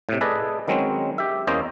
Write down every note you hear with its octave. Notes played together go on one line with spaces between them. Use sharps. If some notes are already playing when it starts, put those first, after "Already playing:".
A2 C3
G#4 A4 B4 D5 D#5
D#3 F#3 G#3 C4 C#4
G4 E5
E2 A#3 C#4 C5 D#5